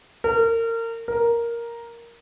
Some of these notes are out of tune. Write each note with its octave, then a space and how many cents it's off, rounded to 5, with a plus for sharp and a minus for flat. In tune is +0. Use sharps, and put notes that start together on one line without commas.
A#4 -30
A#4 +5